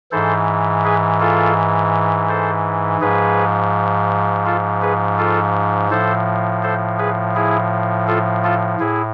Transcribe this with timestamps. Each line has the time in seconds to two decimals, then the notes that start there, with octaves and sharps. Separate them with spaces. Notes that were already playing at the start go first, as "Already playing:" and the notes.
0.12 G#2 E3 A4 C5
0.84 G#4 B4
1.20 F4 A4
2.29 A4 C5
3.01 G#2 F3 G#4 B4
4.46 F4 A4
4.82 G#4 B4
5.18 F4 A4
5.91 A2 F3 A4 C5
6.63 A4 C5
6.99 G#4 B4
7.35 E4 G#4
8.08 F4 A4
8.44 F4 A4
8.80 A2 E4 G#4